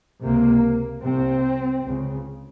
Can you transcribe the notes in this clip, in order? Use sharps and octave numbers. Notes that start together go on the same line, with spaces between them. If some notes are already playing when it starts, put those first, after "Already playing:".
C#2 C3 A#3
C2 C3 C4
C#2 C#3